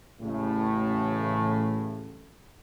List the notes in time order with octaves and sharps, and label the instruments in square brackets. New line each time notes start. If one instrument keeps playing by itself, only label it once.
[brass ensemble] A1 A2 C#3 A3